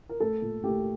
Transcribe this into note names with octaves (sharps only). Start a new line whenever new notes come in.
A#4
A3 A4
A#2
A3 G4